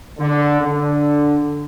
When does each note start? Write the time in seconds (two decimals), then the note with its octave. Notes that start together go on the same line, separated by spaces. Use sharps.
0.19 D3
0.61 D3